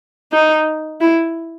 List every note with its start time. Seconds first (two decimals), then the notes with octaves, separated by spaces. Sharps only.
0.32 D#4
1.01 E4